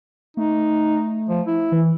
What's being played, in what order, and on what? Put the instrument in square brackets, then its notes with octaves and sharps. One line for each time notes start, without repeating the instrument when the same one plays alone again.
[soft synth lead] A3 [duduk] D#4
[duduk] F3
E4
[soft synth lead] E3